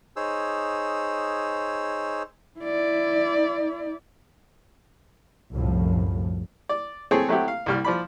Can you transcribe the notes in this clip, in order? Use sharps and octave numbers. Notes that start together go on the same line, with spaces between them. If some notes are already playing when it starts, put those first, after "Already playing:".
D#4 G#4 C5 C#5 E6
E4 D5
C2 F#2 A2 F3
D5
A3 C4 G#4 A4 C#5
F#3 A3 C4 E4 F#4 G4
F5
C2 G3 F6
F3 D5 B5